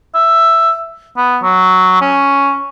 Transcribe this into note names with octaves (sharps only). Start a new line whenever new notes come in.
E5
B3
F#3
C#4